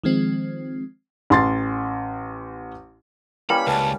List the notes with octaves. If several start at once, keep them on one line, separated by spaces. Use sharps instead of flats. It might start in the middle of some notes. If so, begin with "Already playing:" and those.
D#3 F3 G#3 C4
A1 C6 A6
G3 A#3 C#4 E4 B4 G5 B5
C#2 B4 A5